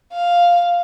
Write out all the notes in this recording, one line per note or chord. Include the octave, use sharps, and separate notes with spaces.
F5